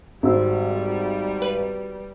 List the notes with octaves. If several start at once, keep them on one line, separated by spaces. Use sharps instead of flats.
G#1 G3 F#4 C5 E6
B4